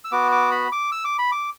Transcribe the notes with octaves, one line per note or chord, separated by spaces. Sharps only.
E6
B3 F#4 D6
D6
B5
D6
E6
D6
B5
D6